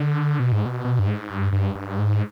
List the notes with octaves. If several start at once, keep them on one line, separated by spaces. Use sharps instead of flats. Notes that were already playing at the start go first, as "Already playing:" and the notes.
Already playing: D3
B2
G#2
B2
B2
G2
G#2
G2
G2
G2
G#2